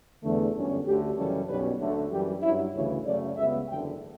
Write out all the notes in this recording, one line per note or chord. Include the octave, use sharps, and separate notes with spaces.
E2 D3 A3
G1 F#2 D3 G3 C#4
D2 D3 A3 G4
F#2 C#3 E3 G3 C#4 A4
B1 B2 G3 C#4 B4
D2 D3 F#3 A3
F#2 E3 G3 G4
G2 F#3 C#4 E4
D2 C#3 E3 C#5
F#2 C#3 F#3 A3 C#4 D5
C#2 C#3 G3 B3 E5
F#1 E2 D3 G5